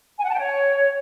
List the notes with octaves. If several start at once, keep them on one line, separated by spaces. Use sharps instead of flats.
G#5
F#5
A5
G5
C#5